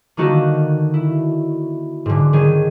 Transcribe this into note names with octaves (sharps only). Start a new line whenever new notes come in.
D3 D#3 A#3 D#4 F#4 A4
E4
G#2 D3
D#3 C#4 G#4